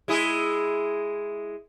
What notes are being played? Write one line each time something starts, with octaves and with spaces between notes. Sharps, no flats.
G#3 E4 G#4